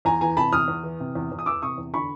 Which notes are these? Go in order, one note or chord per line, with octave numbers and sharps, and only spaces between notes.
E2 G#5 A#5
E3 G#5 A#5
C3 A5 B5
E2 D#6 F6
E2
E3
C3
E2
E2
D#6
E3 D6 E6
C3 C#6 D#6
E2
D3 B5 C#6